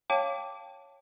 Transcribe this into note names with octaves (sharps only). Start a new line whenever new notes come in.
C#5 F5 G5 A5 D6